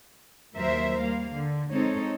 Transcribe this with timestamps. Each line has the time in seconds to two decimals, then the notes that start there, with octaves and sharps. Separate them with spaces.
0.55 D#2 F#3 A#3 A#4 C5 E5
1.01 G3 A#3 F5
1.33 D3
1.72 G#3 C4 D#4 A4 C#5